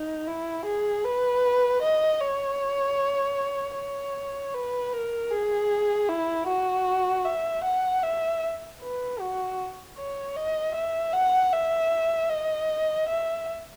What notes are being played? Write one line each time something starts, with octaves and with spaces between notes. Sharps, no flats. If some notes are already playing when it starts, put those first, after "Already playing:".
Already playing: D#4
E4
G#4
B4
D#5
C#5
C#5
B4
A#4
G#4
E4
F#4
E5
F#5
E5
B4
F#4
C#5
D#5
E5
F#5
E5
D#5
E5